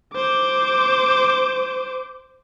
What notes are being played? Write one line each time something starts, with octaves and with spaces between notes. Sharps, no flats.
C5 D6